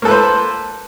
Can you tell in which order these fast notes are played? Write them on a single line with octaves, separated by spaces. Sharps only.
A#3 A4 B4 C5